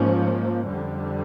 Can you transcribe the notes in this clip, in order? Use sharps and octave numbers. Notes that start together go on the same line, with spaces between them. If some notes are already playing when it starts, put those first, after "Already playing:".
Already playing: G#2 F3 A#3 C#4
F2 D3 G3